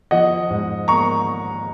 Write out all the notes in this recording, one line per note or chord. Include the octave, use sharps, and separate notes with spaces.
F3 D#5 F#5
G#2
A#3 A#5 C#6